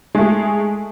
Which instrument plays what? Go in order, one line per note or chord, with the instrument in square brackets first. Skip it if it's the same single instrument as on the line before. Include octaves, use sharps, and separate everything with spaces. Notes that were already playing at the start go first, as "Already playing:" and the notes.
[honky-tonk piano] G#3
A3
G#4